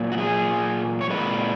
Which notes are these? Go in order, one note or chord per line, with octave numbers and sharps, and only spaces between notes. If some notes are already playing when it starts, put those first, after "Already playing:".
Already playing: A#2 F#3
F#4
G#4
C#5
A#2 G#3 B4